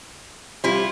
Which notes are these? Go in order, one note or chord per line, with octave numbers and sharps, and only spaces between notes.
G3 E4 F4